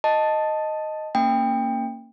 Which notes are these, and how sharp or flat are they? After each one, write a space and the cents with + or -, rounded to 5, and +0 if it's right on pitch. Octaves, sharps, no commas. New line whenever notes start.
D#5 +0 A5 +0
A#3 -15 C#4 +0 G5 +20